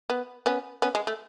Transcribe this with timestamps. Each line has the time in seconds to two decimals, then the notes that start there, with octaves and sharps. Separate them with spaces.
0.10 B3
0.46 B3 C#4
0.82 B3 C#4
0.95 G#3
1.07 A3